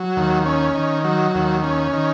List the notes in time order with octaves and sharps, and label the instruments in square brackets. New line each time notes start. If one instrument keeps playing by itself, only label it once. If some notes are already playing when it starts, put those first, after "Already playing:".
Already playing: [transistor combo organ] F#3
D#2
C#4
D#3
F#3
D#2
C#4
D#3